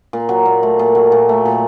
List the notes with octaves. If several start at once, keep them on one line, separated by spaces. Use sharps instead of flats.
A#2
F#3
A#2
A3
A#2
F#3
A#2
A3
A#2